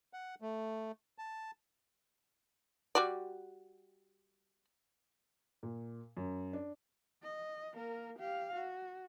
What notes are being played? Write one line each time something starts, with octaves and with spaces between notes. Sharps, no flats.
F#5
A3
A5
G3 F#4 D5
A#2
F#2
D4
D#5
A#3 A#4
G4 F5
F#4